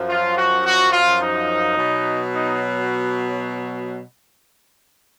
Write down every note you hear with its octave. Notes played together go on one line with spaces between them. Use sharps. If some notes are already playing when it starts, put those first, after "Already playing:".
Already playing: F#2 F3
F4
F#4
F#4
F4
D#4
B2 F#3
D#4